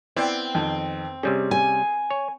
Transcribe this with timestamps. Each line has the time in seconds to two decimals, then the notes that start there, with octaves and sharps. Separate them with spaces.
0.16 B3 C4 E4 D5
0.55 F2 D#3
1.23 C3 G3 C#4 G#4
1.51 G#5
2.10 C#5